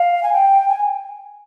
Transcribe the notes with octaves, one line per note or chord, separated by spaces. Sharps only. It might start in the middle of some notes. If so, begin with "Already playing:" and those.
Already playing: F5
G#5
G5
G#5